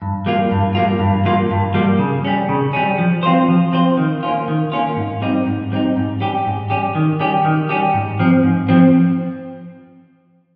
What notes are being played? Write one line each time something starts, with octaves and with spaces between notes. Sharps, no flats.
G2
G3 A#3 F4
G2
G3 A#3 F4
G2
G3 A#3 F4
G2
G3 A#3 F4
C#3
G3 C#4
C#3
G3 C#4
F3
C4 F4 C5
F3
C4 F4 C5
D#3
A#3 C#4 F4
D#3
A#3 C#4 F4
G#2
G3 C4 D#4
G#2
G3 C4 D#4
G#2
G3 C#4 G4
G#2
G3 C#4 G4
D#3
G3 C#4 G4
D#3
G3 C#4 G4
G#2
F3 C4
G#2
F3 C4